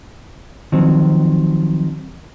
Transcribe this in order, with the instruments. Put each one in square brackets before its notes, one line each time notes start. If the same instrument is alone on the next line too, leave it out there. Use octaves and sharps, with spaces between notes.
[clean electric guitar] D#3 F3 F#3 C4